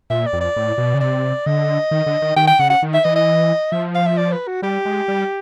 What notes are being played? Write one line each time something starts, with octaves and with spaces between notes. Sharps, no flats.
A#2 E5
D5
F2
D5
A2
B2
C#3
C3 D5
D3 D#5
D#3
D3
D#3
D#3 G5
G5
C#3 F#5
F#5
D#3
E5
E3 D#5
D#5
F3 E5
F5
E5
D5
B4
F#4
G3 G4
G#3
G3